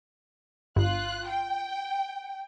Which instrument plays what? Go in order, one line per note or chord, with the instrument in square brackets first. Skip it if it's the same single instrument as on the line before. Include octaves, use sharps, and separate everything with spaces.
[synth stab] G1 [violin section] F4 F#6
[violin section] G5